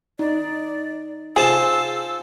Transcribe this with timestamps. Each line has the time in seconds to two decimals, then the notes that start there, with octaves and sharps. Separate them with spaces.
0.19 D#4 D5
1.36 F4 G#4 C5 A5 E6